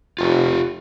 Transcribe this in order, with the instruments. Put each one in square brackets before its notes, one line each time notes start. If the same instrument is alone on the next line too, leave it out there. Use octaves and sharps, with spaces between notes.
[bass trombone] F1 [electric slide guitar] F4 G4